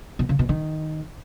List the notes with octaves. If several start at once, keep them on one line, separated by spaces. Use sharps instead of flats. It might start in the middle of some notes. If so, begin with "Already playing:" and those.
B2
C#3
B2
D#3